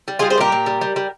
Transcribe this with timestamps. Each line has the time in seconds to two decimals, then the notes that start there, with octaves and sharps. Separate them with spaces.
0.08 G3
0.19 G3 F4 G#4
0.30 G#4 C5
0.38 A#2 G4 A#4
0.52 A#2
0.66 G3
0.81 G3
0.96 G3